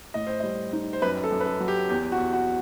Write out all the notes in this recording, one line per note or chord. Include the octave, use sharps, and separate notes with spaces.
A2 D#5
C5
G3 D#5
D#4
C5
F#2 B4
A4
F#2
B4
A4
F#3
G4
E2 G4
F#4
E2
F#4